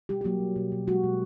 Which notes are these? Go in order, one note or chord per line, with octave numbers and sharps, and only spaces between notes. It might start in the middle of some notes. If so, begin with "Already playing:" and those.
B2 G3 G4
G4
F#3 A#3 F#4
B2
B2
B2
F#3 G#3 F#4
B2